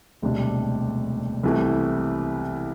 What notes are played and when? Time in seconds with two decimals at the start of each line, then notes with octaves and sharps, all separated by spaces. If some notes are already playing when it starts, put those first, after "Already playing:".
0.22 E1 D2 C3 G3 D4
1.43 C2 C3 E3 A3